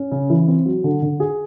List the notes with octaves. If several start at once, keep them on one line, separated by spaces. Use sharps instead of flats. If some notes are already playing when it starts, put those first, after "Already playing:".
Already playing: C#4
C#3
E3
C4
F#3
D3
D3
G#4